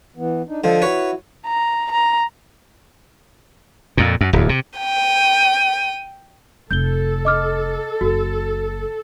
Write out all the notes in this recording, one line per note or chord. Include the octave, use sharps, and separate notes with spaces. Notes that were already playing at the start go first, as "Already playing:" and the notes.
E3 B3
D4 D#4
D3 F3 A4 D#5
E4 F#4 B4 C#5
A#5
A#5
F2 A#2
F#2
D1 E2
C3
G5 D#7
F1 A4 G6 G7
D#5 D6 F6
F#1 F#4